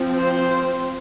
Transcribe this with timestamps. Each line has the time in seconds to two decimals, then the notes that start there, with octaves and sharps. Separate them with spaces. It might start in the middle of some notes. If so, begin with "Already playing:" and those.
Already playing: F3 C4
0.16 C5